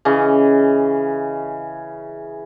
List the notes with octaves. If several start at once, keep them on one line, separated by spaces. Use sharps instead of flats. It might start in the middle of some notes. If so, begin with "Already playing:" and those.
C#3 E3 C#4 D#5